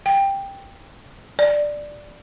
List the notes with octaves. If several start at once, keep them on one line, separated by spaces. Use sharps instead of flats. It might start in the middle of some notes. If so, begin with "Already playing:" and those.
G5
D5